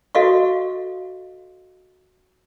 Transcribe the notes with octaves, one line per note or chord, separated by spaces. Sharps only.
F#4 A4 D#5 F5 C#6